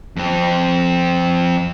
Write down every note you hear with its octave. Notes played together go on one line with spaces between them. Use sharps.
F2 C4